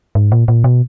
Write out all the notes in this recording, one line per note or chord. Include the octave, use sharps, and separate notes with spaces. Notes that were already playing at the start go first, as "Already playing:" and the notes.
G#2
A#2
A#2
B2